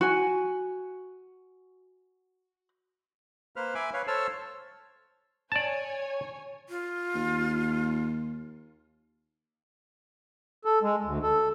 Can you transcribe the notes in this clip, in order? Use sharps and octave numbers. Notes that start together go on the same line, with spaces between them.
F#4 G#5
A#3 B4 C5 F6
E5 G#5 B5 D6
B4 C#5 F5
A4 C5 C#5 A5 E6 F6
C#5 D5 G#5 A5
F4
D#2
A4
G#3
D2
A4